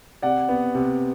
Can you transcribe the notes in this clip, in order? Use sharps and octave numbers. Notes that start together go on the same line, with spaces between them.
C3 D5 F#5
B3
C3